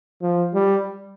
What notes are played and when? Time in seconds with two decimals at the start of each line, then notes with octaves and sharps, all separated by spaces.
0.22 F3
0.54 G3